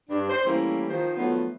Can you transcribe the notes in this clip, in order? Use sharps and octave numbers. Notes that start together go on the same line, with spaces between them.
G2 D4
C5
E3 G3 A3 A#3 C#4 E4
D#3 F3 C5
D#3 F3 F#3 A3 B3